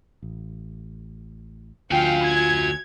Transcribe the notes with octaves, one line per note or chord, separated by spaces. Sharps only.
A1
D2 D3 F4 F#4 F5 G5 G#5
G#6